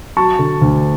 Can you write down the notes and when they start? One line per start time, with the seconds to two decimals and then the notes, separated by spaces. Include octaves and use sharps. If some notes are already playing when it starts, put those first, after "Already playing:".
0.17 F#3 A5 C#6
0.39 D3
0.62 D2